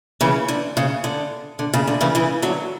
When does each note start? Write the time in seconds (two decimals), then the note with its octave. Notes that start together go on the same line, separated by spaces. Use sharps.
0.21 C#3 E3
0.48 D3
0.77 C#3
1.04 D3
1.59 D3
1.74 C#3
1.88 D3
2.01 C#3 E3
2.15 C#3 E3
2.42 D3 F#3